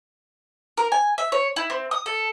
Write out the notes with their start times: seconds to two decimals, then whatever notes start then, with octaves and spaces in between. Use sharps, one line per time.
0.78 A#4
0.92 G#5
1.18 E5
1.32 C#5
1.56 E4
1.70 C4
1.91 D#6
2.06 A4